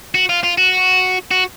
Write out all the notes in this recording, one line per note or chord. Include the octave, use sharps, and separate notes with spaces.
F#4
F4
F4
F#4
F#4